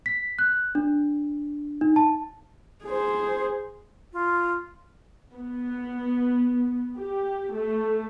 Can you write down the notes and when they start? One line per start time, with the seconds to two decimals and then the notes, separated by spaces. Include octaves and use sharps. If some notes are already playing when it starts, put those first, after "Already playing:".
0.06 B6
0.39 F#6
0.75 D4
1.81 D#4
1.96 A5
2.85 G#4 C5
4.13 F4
5.34 B3
6.97 G4
7.52 A3